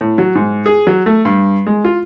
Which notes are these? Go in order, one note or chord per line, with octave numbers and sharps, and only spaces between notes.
A2
F#3
G#2
G#4
F#3
A3
G2
G#3
F4